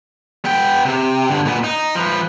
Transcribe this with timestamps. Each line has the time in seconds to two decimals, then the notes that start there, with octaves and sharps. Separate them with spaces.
0.45 B3 G5
0.85 C3
1.30 G2 D3
1.45 A#2 B3
1.64 D#4
1.95 F3 B4